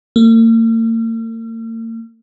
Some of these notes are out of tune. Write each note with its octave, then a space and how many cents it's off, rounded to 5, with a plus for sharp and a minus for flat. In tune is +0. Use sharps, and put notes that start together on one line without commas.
A#3 -45